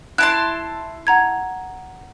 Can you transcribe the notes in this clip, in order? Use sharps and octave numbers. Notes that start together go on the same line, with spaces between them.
E4 A5 C6 F#6
F#5 A#5 G#6